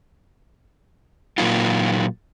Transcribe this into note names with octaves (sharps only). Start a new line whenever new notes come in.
A#2 F#3 A#3 D#4 F4